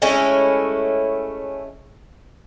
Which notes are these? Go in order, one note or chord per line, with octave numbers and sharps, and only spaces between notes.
G#3 A3 C#4 E4